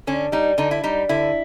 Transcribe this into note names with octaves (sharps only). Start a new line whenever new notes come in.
D3 C#4
G3 D#4
D3 D#4
E4
G3 D#4
D3 E4